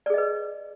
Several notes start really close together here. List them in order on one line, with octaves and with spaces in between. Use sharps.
D5 G#4 D#5 B4